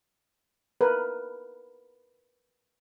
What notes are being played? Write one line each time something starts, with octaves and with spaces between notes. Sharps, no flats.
A#4 B4